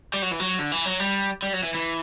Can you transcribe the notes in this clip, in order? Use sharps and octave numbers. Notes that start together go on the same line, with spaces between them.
G3
F#3
E3
F#3
D3
E3
F#3
G3
G3
F#3
E3
E3